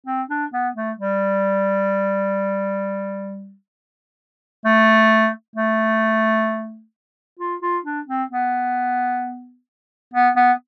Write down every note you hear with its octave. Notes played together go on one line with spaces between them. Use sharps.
C4
D4
B3
A3
G3
A3
A3
F4
F4
D4
C4
B3
B3
B3